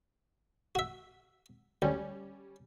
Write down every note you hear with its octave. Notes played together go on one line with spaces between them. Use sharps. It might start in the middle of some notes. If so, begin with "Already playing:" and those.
F#4 E5
D2 G3 C#4